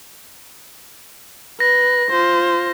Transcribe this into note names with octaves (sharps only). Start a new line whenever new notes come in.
B4 A#6
F4 C5